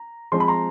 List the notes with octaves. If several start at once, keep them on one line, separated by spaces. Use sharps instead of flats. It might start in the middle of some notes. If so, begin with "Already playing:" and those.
Already playing: A#5
F3 G#3 C4 C6
B5
A#5 C6